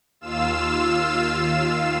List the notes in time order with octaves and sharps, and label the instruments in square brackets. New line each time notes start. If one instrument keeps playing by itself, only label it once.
[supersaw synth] D#2 F4 F5 E6 E7